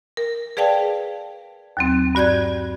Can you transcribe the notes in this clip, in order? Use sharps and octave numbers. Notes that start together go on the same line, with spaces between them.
A#4
G#4 B4 D5 F5 G5 A5
D#2 F#3 C4
G2 F#4 D5 G6 G#6